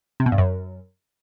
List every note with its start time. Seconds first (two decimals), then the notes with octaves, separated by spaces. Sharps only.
0.20 C3
0.26 B2
0.32 G2
0.38 F#2